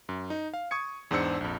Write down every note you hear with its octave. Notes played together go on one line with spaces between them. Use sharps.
F#2
D#4
F5
C#6 D#6 G#6 C#7
E2 G#2 D4 C5 E6 C#7
A#1 F2